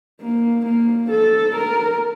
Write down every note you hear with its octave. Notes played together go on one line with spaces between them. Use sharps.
A#3
A#3
A4
A#4